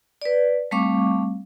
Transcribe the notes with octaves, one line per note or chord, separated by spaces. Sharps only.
B4 D5
G3 A3 C4 F5 C#6 D6